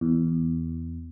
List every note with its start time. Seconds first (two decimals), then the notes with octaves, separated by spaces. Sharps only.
0.01 E2